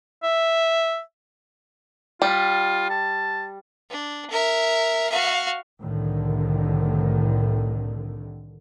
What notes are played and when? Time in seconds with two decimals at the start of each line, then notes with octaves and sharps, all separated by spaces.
0.23 E5
2.22 G3 F4
2.90 A5
3.90 D4
4.30 A#4 E5
5.10 F#4 F5
5.81 C2 A2 D3 D#3